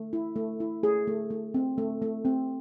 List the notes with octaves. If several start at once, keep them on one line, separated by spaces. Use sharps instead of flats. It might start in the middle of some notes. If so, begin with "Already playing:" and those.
Already playing: A3
E4
A3
E4
A3 G#4
A3
A3
C4
A3
A3
C4